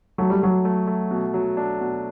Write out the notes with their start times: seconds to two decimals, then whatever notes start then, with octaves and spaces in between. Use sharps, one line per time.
0.18 F#3 A3
0.30 G3
0.42 F#3 A3
0.65 A3
0.87 A3
1.11 B2
1.34 F#3
1.57 D4
1.80 B2